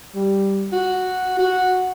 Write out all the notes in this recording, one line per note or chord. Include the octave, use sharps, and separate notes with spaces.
G3
F#4
F#4